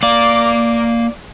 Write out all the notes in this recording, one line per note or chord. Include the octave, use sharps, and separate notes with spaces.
A#3 D5 F5